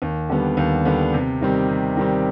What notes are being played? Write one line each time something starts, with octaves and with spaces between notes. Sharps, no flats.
D#2
D3 G3 B3
D#2
D3 G3 B3
C3
D#3 G3 C4
C3
D#3 G3 C4